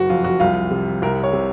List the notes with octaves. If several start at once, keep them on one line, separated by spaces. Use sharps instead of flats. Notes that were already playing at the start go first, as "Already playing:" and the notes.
Already playing: F#1 F#4
F2 F4
F#4
C2 F4
C3
C2 A#4
C#5
C3